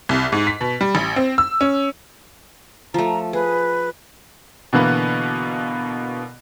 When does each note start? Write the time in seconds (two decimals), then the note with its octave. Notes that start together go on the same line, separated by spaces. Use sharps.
0.09 C2
0.32 G#2
0.47 B6
0.61 B2
0.81 G3
0.95 A1
1.16 C4
1.38 E6
1.61 C#4
2.94 F3 A3 A#5
3.33 G#4 B4
4.73 B2 D3 E3 A#3 B3